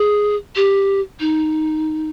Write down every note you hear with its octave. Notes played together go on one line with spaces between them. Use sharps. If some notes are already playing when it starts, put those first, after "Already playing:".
Already playing: G#4
G4
D#4